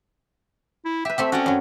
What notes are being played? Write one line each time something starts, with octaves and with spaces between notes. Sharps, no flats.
E4
G4 B4 E5
A3 C4 G4
C#4 F#4 D5 F#5
F#2 F#3